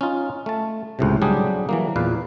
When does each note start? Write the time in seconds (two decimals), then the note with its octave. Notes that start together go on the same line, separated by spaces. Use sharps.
0.01 C#4 D#4 F4
0.46 A3 A5
0.99 C#2 A2 C3
1.22 F#3 G3 C4 D4 G4 G#4
1.69 E3 F#3 A#3
1.96 E2 A#2 B4 F5